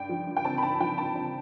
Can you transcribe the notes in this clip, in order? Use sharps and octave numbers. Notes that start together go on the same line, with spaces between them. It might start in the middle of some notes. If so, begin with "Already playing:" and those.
Already playing: G2 G5
F3
G2
G5
C4 A5
B5
G2 A5
F3 G5
G2 A5
C4